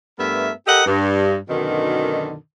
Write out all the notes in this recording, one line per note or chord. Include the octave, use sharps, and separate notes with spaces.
G2 A3 B3 A#4 E5
G4 A4 A#4 D#5 F#5
G2
F#2 B2 D3 D#3